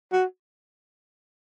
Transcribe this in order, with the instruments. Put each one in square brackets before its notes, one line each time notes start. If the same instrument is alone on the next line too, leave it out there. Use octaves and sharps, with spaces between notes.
[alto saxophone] F#4